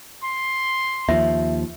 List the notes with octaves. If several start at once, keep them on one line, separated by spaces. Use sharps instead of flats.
C6
D#2 F3 E5